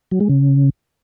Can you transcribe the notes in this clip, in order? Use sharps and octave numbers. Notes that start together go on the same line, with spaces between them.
F#3
G#3
C#3